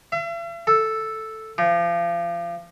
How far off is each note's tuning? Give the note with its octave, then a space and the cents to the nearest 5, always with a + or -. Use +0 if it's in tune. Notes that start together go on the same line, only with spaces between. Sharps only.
E5 +45
A4 +0
F3 -30